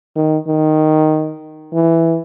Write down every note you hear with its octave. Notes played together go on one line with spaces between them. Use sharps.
D#3
D#3
E3